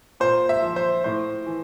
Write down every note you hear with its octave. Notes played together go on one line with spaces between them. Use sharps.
A#2 C5
E5
F3
C5
A2 C5
E3